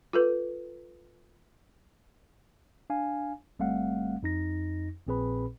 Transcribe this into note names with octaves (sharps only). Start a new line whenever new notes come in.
F4 A4 B4
D4 F5 G#5
G1 G3 A3 C4 F5 F#5
F2 D#4 A#6
A#1 A#2 C4 G#4 B4 B5